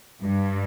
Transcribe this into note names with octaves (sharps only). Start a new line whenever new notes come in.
G2